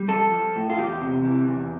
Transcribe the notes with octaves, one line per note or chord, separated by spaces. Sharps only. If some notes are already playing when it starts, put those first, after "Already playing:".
Already playing: G3
F3 A4
F3
A2
F4
E2 G4
C3
E3
E2